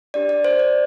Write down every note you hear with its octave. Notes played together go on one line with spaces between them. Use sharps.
D4 G4 D5
D5
C5
D5